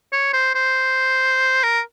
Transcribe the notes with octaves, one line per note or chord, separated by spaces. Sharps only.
C#5
C5
C5
A#4